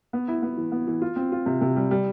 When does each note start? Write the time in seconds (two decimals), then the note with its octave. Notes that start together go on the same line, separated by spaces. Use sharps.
0.13 B3
0.28 E4
0.43 B3
0.57 E3
0.72 B3
0.87 E3
1.01 F4
1.16 C4
1.32 F4
1.46 C3
1.61 C3
1.76 G3
1.91 G3